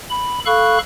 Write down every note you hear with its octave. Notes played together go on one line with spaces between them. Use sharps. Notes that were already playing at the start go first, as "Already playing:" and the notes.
B5
A4 F5 B5 C#6 F#6